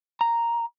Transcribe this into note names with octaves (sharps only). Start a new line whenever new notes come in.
A#5